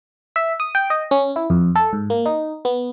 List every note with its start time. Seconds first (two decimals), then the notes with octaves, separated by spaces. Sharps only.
0.36 E5
0.60 D#6
0.75 G5
0.90 D#5
1.11 C#4
1.36 E4
1.50 F2
1.76 A4
1.93 G#2
2.10 A#3
2.26 D#4
2.65 B3